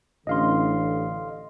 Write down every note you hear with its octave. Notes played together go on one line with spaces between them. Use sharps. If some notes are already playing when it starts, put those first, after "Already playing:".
A1 D3 D#5 F5 C6